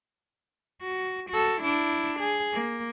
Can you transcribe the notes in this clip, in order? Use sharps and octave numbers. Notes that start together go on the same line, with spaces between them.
F#4
F#4 A4
D4 E4
G#4
A#3